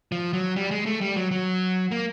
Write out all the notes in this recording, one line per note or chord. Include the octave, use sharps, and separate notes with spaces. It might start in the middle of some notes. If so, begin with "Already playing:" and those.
F3
F#3
G3
G#3
A3
G3
F#3
F#3
A#3